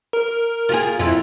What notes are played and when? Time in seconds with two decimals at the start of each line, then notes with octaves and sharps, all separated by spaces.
0.13 A#4
0.69 F4 F#4 G#4
0.99 F2 E4 F4